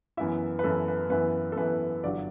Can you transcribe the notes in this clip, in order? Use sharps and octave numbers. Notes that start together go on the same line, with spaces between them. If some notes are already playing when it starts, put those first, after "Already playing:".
F#2 E3 B3 E4 E5
B4
F#2 E3 B3 E4 A4
B4
F#2 E3 B3 E4 B4
A4
F#2 E3 B3 E4 B4
G1 G2 F#3 D5